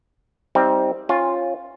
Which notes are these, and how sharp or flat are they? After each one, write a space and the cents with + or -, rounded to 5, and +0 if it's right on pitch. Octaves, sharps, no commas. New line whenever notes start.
G3 +0 C4 +0 D#4 +30
C#4 -25 F4 +0